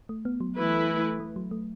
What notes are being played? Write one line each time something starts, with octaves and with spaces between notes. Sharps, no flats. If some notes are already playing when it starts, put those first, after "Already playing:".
A3
B3
F#3
E3 A3 E4 B4
A3
F#3
A3